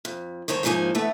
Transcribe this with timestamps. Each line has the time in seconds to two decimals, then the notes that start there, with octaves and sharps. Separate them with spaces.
0.05 F2
0.48 D2 G2 D#3 C5 C#5
0.63 D#2 G#2 F3 A#3 D#4 G#5
0.95 D3 E3 A3 B3